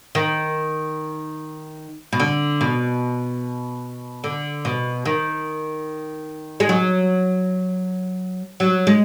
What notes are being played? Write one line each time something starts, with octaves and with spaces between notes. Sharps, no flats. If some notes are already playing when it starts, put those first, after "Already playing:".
D#3
B2
D3
B2
D3
B2
D#3
G#3
F#3
F#3
G#3